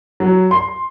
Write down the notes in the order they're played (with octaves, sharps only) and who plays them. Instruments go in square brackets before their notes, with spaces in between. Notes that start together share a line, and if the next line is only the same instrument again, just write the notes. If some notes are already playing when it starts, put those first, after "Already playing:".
[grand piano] F#3
C6